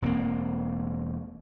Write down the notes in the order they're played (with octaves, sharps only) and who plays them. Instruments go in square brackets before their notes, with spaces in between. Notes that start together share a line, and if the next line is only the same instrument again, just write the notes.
[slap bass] E1 G2 A#3 C4